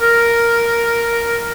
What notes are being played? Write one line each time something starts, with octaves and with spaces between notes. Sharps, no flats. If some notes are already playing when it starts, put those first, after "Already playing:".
A#4